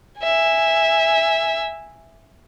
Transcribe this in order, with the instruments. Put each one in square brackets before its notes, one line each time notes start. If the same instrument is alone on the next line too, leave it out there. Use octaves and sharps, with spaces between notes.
[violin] E5 G#5